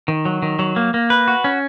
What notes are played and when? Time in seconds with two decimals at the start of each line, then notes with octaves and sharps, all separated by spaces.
0.08 D#3
0.25 F#3
0.42 D#3
0.59 F#3
0.76 A#3
0.94 A#3
1.10 B4
1.28 F#4
1.44 C#4